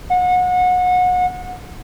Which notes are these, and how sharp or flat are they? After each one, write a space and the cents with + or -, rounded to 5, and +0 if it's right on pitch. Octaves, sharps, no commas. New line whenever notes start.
F#5 -30